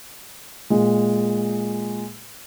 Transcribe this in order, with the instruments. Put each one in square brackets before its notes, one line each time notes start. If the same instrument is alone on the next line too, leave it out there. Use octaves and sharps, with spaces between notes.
[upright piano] A#2 G#3